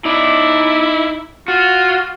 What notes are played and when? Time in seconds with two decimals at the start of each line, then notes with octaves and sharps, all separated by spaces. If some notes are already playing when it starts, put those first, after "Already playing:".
0.05 D#4 E4 D5
1.48 F4 F#4